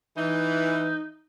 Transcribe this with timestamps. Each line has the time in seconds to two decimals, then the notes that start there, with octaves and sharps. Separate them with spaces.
0.17 E3 D#4